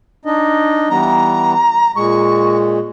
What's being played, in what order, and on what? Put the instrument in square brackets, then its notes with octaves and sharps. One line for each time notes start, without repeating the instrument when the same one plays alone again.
[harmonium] D4 D#4 D#5
[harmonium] E3 G3 B3 [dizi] A#5
[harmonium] A#2 G#3 [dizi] C#6